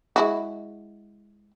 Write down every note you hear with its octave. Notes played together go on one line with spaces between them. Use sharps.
G#3 E4 F#4